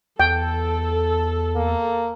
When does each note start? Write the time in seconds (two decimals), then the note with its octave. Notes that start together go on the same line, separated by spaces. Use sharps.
0.20 E2 A4 G5
1.55 A#3